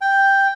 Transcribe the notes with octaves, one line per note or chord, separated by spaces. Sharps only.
G5